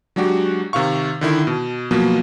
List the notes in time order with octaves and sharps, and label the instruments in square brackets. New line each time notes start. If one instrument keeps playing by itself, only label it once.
[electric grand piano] F#3 G#3 D4 F#4 G4
C3 D#3 F5 C#6
D3 D#3 E4
B2
B2 F3 F#3 A#3 B3